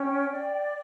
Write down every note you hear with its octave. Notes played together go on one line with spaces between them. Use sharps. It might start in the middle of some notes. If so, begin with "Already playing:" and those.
Already playing: C#4 G5
D5